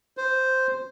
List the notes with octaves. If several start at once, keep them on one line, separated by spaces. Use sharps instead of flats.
C5